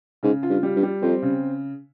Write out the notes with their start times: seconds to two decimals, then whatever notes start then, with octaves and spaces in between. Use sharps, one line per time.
0.23 G#2 C#3
0.43 F4
0.50 G2
0.63 G3
0.76 G2
0.83 G3
1.02 F2 C4
1.22 C#3